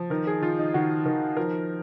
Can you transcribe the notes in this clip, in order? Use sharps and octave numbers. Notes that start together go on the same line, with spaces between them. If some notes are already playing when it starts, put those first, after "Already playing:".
Already playing: F3
D#3 A#4
G#4
D#3 F4
D#4
D#3 F#4
D#3 A#4
F3 A#4